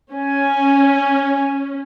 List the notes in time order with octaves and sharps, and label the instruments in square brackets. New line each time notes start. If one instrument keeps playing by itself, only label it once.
[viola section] C#4 [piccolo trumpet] G#5